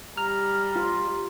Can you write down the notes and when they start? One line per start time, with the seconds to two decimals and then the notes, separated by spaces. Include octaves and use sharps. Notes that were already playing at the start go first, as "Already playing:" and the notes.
0.18 G3 A#5 F6
0.76 F4